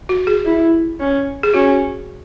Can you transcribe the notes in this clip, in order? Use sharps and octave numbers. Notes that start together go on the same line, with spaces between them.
F#4
G#4
E4
C#4
G#4
C#4 F#4